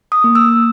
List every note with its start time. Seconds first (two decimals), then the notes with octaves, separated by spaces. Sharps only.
0.12 D#6
0.24 A#3
0.35 E6